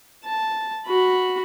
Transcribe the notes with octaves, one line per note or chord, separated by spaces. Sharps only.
A5
F#4 B5